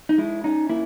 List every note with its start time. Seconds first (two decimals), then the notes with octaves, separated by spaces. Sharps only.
0.09 D#4
0.18 G#3 E4
0.44 C#4 D#4
0.69 A#3 E4